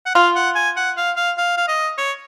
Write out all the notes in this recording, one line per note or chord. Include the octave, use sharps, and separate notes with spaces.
F#5
F4 F5
F#5
G#5
F#5
F5
F5
F5
F5
D#5
C#5